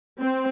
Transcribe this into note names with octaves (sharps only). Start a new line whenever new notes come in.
C4